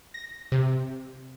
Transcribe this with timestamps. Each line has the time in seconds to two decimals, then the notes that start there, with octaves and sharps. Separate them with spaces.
0.14 A#6
0.52 C3